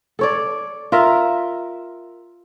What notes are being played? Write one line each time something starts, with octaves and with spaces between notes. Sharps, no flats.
A4 C#5 D5
F4 A#4 E5